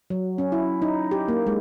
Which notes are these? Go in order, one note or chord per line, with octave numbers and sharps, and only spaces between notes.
F#3
C#4
E4
D#4
G4
A#3
G#3